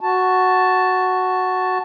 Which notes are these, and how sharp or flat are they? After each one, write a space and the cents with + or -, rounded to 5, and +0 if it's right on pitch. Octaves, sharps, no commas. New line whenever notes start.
F#4 +0 A5 +0